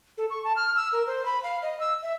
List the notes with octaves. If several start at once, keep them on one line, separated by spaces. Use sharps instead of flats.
A4
C#6
A5
F6
E6
A#4
C5
B5
F5
D#5
E6
E5